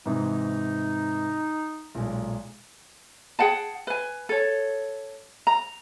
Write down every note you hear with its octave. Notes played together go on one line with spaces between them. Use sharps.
G#2 C3 E3 D#4
B1 A#2 G#3
G#4 F#5 G5 A5
B4 G#5
A4 C#5
A#5